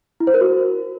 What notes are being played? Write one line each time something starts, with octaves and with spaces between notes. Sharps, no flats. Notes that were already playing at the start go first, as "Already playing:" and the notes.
E4
C5
A#4
F#4